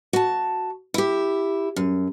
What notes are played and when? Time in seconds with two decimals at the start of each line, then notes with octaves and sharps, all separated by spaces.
0.13 F#4 A5
0.94 E4 G4
1.76 F#2